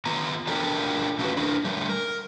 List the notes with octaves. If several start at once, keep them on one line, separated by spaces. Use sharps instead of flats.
D#3 B3 F4 A#5
D4 F4 G4 A4 A#4
A3 C#4 F4 F#4 A4 B4
D4 E4 A#4
D3 G3 A3
A#4